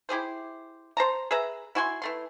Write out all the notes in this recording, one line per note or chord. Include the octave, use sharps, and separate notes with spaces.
E4 G4 G#4 C5
C5 A5 A#5
G#4 B4 E5 A#5
E4 F#4 G#5 C6
E3 A3 C6